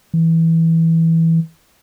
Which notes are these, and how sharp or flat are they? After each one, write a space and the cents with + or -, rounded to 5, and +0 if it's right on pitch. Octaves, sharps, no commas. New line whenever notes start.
E3 -10